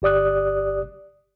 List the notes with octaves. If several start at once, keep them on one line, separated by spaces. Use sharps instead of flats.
G1 G4 D5 D#6 F#6